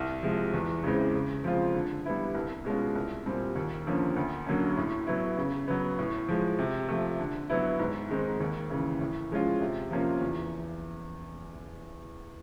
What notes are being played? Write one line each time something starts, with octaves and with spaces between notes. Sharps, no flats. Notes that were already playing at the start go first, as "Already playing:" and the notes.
Already playing: C2
C3 F3 G#3
E2
C#3 E3 G#3 C4
C#3
F3 G#3 C4 F4
D3
G3 B3 E4
C2
B2 G#3 C#4 F4
C2
A#2 G3 C4
D#2
D3 F3 A#3 C#4
D2
D3 F#3 A#3 C#4
A2
F#3 B3 E4
C#3
F#3 B3
A2
F3 G#3
C3
F3 A3
D3
F#3 B3 E4
G#2
D#3 G#3 C4 D#4
D#2
C#3 E3
A2
F3 G#3 C#4 F4
C3
F3 A#3 C#4 F4
E2